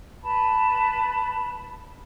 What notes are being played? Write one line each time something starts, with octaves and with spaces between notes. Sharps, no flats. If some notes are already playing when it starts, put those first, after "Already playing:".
B4 A5 B5